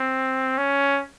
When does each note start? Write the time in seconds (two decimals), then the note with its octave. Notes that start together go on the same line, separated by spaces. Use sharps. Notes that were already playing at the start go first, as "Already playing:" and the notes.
Already playing: C4
0.58 C#4